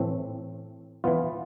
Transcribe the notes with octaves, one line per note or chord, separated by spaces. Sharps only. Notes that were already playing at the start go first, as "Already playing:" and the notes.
Already playing: A2 E3 A3 C4
E3 B3 F4